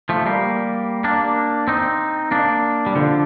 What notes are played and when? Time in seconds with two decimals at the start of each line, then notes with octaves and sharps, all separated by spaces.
0.09 F3 A3
0.26 G3 A#3
1.04 A#3 D4
1.68 C4 D#4
2.31 A#3 D4
2.86 G3
2.95 D3 F3